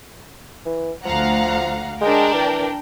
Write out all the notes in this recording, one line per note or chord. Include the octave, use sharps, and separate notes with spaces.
E3
D2 F3 F5 F#5 A#5
G#3 D4 A#4 G5
E3